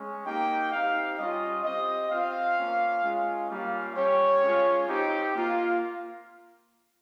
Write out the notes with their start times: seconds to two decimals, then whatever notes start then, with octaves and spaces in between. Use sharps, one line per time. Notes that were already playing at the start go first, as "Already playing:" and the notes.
Already playing: G#3 C#4
0.26 A#3 D#4 G4 G5
0.72 C4 D#4 G4 F5
1.18 G3 C#4 F4 D#5
1.64 C4 G4 D#5
2.11 C4 F4 F5
2.58 A#3 C#4 F4
3.03 G#3 C#4 F4
3.50 G3 A#3 C#4 F4 F5
3.96 G3 C#4 G4 C#5
4.42 G#3 C#4 F4
4.88 C4 D#4 G4
5.35 A#3 F4